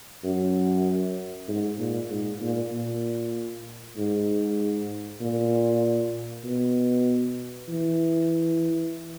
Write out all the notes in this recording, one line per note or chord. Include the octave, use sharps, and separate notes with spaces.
F#2
G#2
A#2
G#2
A#2
A#2
G#2
A#2
B2
E3